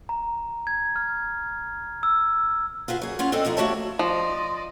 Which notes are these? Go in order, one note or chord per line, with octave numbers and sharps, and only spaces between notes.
A#5
G#6
F6
E6
F4 F#4 G#4 B4
F#2 G#4
C#4 F4 F#5
C4 D4 A4 D#5
E3 F3 G#3 D#4
A3 A#3 F#4 G4 C#5 A5
F3 D5 D#5 C6